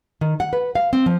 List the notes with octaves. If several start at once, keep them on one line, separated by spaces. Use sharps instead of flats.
D#3
F#5
B4
F5
C4
F3